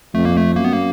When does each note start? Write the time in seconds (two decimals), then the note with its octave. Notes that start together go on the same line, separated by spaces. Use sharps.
0.15 F2 A3
0.25 A#3
0.37 A3
0.56 F#2 A#3
0.64 B3
0.73 A#3